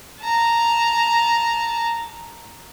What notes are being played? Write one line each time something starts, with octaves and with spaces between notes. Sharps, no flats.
A5 A#5